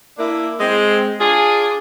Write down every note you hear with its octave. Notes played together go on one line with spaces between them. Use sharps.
A#3 D4 E4
G#3 C4
D4 F4 G#4